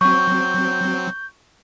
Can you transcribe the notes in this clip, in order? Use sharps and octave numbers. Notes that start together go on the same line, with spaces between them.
F#3 C4 C#6 G6